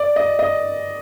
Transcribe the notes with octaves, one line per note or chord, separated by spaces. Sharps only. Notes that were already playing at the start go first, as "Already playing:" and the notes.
Already playing: D5
D#5
D#5